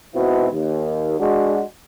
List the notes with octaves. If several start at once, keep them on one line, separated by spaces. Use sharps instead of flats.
G#2 B2 C4 D#4 E4 F#4
D#2
G#3 D4 F#4